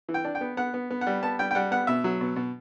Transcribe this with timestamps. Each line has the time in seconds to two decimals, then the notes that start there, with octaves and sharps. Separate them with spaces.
0.09 E3
0.14 G5
0.25 D4
0.35 G5
0.41 B3
0.57 B3 F#5
0.74 B3
0.90 B3
1.01 F#5
1.07 G3
1.23 B3 A5
1.39 G3 G5
1.51 G5
1.55 G3 F#5
1.71 B3 F#5
1.87 B2 E5
2.04 F#3
2.21 B2
2.36 B2